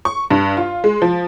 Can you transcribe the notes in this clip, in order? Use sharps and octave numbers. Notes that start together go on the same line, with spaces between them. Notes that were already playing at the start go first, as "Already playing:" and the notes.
C#6
G2
F4
G#3
F3